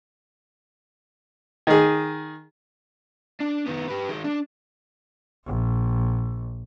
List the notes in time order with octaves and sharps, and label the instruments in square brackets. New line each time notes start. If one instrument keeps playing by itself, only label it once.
[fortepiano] D#3 G#4
[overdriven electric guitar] D4
D#3 B3
G4 B4
D#3 G#3
D4
[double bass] A#1